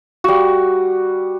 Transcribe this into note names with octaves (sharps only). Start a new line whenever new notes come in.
G3 F#4